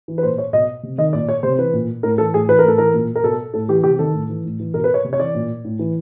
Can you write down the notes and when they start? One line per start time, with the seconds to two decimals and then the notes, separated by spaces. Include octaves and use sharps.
0.08 E3
0.18 B4
0.23 A#2 C5
0.38 C#5
0.53 B2 D#5
0.83 C3
0.98 D#3 D#5
1.13 A#2 D5
1.29 C#5
1.43 C3 C5
1.58 E3 B4
1.73 A#2
2.03 A2 A#4
2.18 E3 A4
2.34 A2 G#4
2.49 E3 B4
2.59 A#4
2.64 A2 A4
2.78 E3 A#4
2.94 A#2
3.16 A#4
3.23 B2 A4
3.54 A2 A4
3.68 E3 G4
3.84 C3 G4
3.99 D#3 A4
4.14 A2
4.29 E3
4.44 A2
4.60 E3
4.74 B2 A#4
4.84 B4
4.94 C#5
5.04 C3
5.13 C#5
5.19 E3 D5
5.35 A#2
5.65 A2
5.79 E3